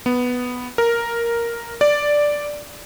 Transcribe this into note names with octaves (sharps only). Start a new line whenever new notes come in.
B3
A#4
D5